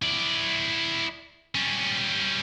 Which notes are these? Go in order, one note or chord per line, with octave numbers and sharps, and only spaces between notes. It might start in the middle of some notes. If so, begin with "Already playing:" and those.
E4 D5
G3 C#4